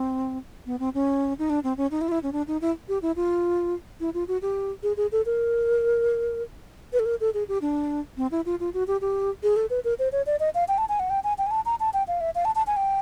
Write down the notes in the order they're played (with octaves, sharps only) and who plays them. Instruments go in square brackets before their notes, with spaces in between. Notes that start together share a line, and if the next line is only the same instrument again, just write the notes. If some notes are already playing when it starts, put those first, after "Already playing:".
Already playing: [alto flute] C4
B3
C4
C#4
D#4
D4
C4
C#4
D#4
E4
F4
E4
C#4
D4
D#4
E4
G4
E4
F4
E4
F4
F#4
G4
G#4
G#4
A4
A#4
B4
A4
A#4
A4
G#4
G4
D4
C4
E4
F4
F4
F#4
G4
G4
G#4
A4
B4
A#4
C5
C#5
D5
D#5
F5
G5
A5
G#5
F#5
G5
G#5
G5
G#5
A5
A#5
A5
G5
F5
E5
F5
A5
A5
G#5
G5